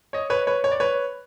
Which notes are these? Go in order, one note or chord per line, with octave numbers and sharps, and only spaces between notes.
C#5 D#5
B4 C#5
B4 C#5
C#5
D5
B4 C#5